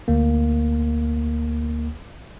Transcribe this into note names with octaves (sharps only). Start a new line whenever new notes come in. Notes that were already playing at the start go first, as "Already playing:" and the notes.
D2 A#3